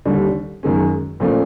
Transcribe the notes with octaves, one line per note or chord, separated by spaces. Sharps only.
D#2 D3 G3
F#2 D#3 G#3 C#4
A#2 F3 A3 C#4